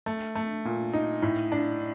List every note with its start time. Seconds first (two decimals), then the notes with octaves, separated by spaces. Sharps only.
0.06 A3
0.35 A3
0.65 A#2
0.93 D#4
1.22 A2
1.52 D4